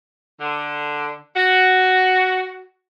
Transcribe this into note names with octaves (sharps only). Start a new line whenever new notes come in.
D3
F#4